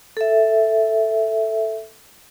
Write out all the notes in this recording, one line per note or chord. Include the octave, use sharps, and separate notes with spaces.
A4 E5